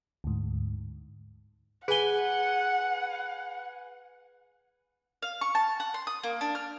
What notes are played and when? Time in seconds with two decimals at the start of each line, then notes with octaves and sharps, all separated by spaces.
0.24 D2 G#2
1.88 G#4 B4 F#5 G#5 G7
5.22 F5
5.41 C#6
5.55 A5
5.80 F#5
5.94 C6
6.07 D#6
6.23 A#3
6.41 D4
6.55 F6